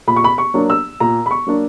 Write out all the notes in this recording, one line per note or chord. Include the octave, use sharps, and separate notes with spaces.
A#2 B5
C#6
B5
C#6
F#3 A#3 D4
E6
A#2 A#5
B5
C#6
F#3 A#3 D4